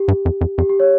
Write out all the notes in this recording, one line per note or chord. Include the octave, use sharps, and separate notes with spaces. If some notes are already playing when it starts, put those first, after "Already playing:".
Already playing: G4
G2
F2
F2
F2 G4
G4
C#5